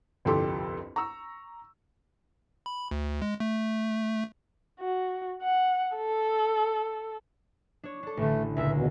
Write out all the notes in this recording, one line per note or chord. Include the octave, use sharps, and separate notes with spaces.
G1 C2 F2 G4 A4 C6
A#5 C#6 E6
B5
D2
G#3
A3
F#4
F#5
A4
D4 C#5
D4 A4
A1 D3 A3
C#2 A#2 E5
E2 B2